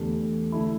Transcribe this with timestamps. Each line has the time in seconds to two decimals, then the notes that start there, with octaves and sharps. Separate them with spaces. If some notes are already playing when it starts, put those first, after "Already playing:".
Already playing: E2 D3 A3 G4
0.52 D3 A3 E4